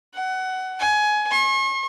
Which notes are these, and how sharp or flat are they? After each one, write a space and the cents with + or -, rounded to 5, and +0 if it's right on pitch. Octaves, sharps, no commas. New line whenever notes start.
F#5 +20
G#5 +20
C#6 -45